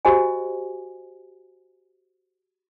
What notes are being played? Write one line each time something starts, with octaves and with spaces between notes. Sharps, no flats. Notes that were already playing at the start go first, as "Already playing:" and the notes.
F#4 G4 C5 D#5 G#5